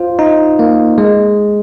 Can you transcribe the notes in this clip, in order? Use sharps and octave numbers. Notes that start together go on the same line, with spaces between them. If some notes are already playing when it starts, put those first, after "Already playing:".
Already playing: F4 C5
D#4
A#3
G#3